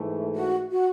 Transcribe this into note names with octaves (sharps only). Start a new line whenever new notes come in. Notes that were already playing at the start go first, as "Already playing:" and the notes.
Already playing: G#2 E3 A3
F#4
F#4